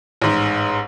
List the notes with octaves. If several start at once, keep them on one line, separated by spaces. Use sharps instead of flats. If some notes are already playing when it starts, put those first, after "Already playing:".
A1 G#2